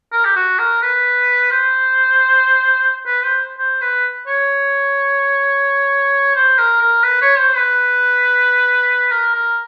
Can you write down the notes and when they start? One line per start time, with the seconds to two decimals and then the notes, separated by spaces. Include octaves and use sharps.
0.12 A#4
0.25 G4
0.36 F#4
0.59 A#4
0.82 B4
1.51 C5
3.07 B4
3.24 C5
3.59 C5
3.81 B4
4.27 C#5
6.35 C5
6.58 A#4
6.81 A#4
7.04 B4
7.22 C#5
7.38 C5
7.56 B4
9.12 A#4
9.34 A#4